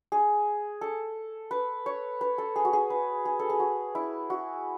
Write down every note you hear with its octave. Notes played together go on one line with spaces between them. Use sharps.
G#4
A4
B4
C#5
B4
A4
G#4
F#4
G#4
B4
G#4
A4
G#4
F#4
E4
F#4